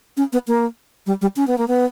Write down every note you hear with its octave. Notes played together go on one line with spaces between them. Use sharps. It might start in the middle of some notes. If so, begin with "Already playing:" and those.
C#4
B3
A#3
G3
G3
C#4
B3
A#3
B3